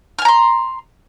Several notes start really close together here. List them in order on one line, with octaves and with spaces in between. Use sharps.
F6 G#5 A#5 C6